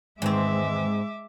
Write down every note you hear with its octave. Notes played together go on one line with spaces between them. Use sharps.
E2 G#2 D#3 G#3 C4 B4 E5 D6